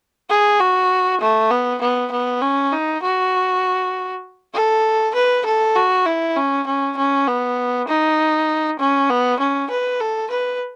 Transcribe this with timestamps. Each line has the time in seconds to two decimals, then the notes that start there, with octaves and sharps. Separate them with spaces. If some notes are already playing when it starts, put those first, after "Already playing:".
0.29 G#4
0.60 F#4
1.21 A3
1.51 B3
1.81 B3
2.12 B3
2.42 C#4
2.72 D#4
3.03 F#4
4.54 A4
5.15 B4
5.46 A4
5.76 F#4
6.06 E4
6.36 C#4
6.67 C#4
6.97 C#4
7.27 B3
7.88 D#4
8.79 C#4
9.10 B3
9.40 C#4
9.70 B4
10.00 A4
10.31 B4